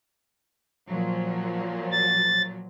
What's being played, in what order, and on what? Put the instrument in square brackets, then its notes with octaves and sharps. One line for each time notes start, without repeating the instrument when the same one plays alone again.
[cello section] A#2 F3 F#3
[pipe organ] A6